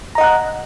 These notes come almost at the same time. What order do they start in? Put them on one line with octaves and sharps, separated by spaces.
A#5 D#5 F#5 F#6